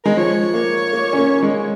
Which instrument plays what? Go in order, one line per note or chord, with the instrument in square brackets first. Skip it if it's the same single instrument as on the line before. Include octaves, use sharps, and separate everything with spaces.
[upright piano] G#3 [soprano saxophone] A#4
[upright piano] F3 [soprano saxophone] C#5
[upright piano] A#3
A#3
C#4
A#3
G#3